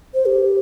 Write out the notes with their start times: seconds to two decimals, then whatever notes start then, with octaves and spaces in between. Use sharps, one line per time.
0.14 C5
0.26 G4